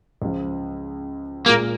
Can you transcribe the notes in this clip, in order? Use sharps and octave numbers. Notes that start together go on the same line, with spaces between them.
C#2 C#3 F3
A#2 G#3 A#3 F4 G#4